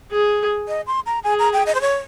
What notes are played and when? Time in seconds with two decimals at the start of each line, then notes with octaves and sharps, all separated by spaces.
0.11 G#4
0.68 D#5
0.87 C6
1.06 A#5
1.24 G#4 G#5
1.39 A#5
1.53 G5
1.66 D#5
1.75 C5
1.81 C#5